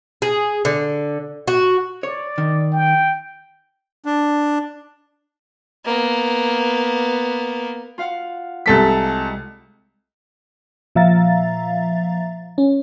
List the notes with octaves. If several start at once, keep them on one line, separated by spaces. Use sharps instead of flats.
G#4
D3
F#4
C#5 D5
D#3
G5
D4
A#3 B3
F4 F5 F#5
C2 G3 G#3 A4 B6
A#2 F3 E5 F5 A#5 A6
C#4